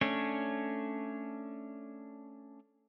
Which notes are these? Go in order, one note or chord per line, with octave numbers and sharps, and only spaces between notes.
A3 C#4 D4 C#5